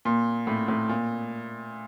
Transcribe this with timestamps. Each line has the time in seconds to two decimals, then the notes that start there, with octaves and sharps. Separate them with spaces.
0.05 A#2
0.47 A2
0.68 A2
0.89 A#2